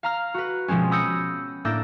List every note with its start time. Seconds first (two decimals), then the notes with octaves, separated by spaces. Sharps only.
0.03 F5 A#5 F6
0.34 F#4 B4
0.68 B2 F3 G#3 C4 C#4
0.91 B5 D#6 E6 G6 A#6 C#7
1.65 A2 A#3 D4 E6 G6 A#6